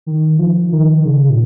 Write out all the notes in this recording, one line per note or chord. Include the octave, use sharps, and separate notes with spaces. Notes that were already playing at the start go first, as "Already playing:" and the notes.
D#3
F3
D#3
C#3
A#2